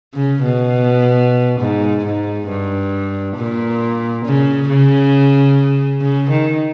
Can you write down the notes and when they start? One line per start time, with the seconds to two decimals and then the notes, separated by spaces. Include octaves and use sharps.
0.14 C#3
0.43 B2
1.60 G#2
2.05 G#2
2.49 G2
3.37 A#2
4.25 C#3
4.70 C#3
6.01 C#3
6.30 D#3